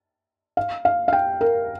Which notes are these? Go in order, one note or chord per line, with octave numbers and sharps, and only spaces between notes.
F5
F5
F5
G5
A#4